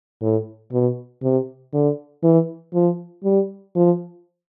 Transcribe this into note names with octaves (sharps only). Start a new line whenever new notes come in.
A2
B2
C3
D3
E3
F3
G3
F3